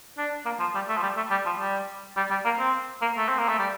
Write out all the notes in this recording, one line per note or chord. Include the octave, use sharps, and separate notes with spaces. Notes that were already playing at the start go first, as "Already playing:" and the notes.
D4
A#3
F3
G3
A3
F3
G3
A3
G3
F3
G3
G3
G3
A#3
C4
A#3
A3
C4
A#3
A3
G3